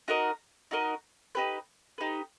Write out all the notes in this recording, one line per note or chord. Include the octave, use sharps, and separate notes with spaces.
D#4 F#4 A#4 D#5
D#4 F#4 A#4 D#5
D#4 G4 B4
D#4 G4 B4